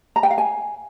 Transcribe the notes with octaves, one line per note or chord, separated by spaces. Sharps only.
A#5
G5
F5
G#5